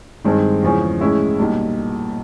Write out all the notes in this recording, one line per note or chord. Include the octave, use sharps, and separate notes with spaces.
G2 D#3 G#3 C4
E2 C#3 F3 G#3 C#4
A2 E3 G#3 C#4 E4
B1 A#2 G3 A#3